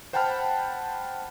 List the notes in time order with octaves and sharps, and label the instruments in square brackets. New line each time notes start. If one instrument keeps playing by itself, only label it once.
[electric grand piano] C5 F#5 G5 A5 B5 F6